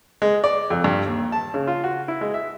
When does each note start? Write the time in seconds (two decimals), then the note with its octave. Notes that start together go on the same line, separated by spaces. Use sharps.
0.22 G#3
0.44 D5
0.70 F2
0.84 G2
1.06 D#2
1.32 A5
1.54 C#3
1.67 F4
1.84 F#4
2.08 E4
2.21 G#3
2.34 E5